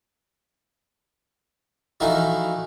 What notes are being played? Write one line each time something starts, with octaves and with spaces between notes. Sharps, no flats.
E3 F3 A3 D#4 E4 F#4